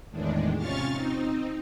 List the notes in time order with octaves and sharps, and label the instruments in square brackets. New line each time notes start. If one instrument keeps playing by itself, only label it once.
[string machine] E2 A2 D#3 G#3 D4
C3 C#4 F4 C#6 F6 A6
C4 D#4